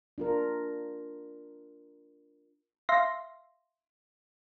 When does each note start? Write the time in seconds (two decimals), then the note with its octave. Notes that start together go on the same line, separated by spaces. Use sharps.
0.18 D4 F4 A#4
2.89 E5 F5 C6 A#6